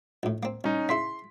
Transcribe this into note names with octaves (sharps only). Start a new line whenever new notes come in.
A#1 A2
A#3 C4
C2 C#4 D#4
C#3 E4 C6 B6